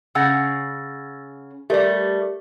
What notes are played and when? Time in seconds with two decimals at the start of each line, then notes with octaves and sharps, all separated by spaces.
0.15 C#3 C#4 F#5 E6 A6 A#6
1.70 G3 A3 G4 A#4 D5